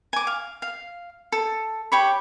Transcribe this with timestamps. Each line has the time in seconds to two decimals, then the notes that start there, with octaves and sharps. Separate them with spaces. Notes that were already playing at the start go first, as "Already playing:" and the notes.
0.13 G#5 D6
0.27 F5
0.62 F5
1.32 A4
1.92 G4 C#5 B5